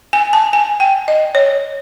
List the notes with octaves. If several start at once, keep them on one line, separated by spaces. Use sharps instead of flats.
G#5
A5
G#5
G5
D#5
C#5